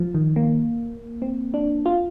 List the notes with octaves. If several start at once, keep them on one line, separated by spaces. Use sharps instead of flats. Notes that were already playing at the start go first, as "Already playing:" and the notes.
Already playing: F3
D#3
A#3
C4
D4
F4